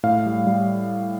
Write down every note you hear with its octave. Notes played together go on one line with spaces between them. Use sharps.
A2 F5
G3
G3